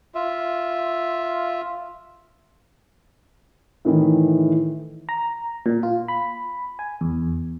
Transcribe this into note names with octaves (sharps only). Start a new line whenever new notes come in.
F4 E5
A2 D#3 E3
A#5
A#2
F4
B5
G#5
E2